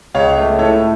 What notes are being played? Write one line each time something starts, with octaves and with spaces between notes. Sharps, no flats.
C#2 C#5 F5
A3
A2 A4 C#5